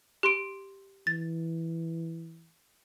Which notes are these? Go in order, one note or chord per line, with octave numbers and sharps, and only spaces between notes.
G4 C6 D7
E3 A6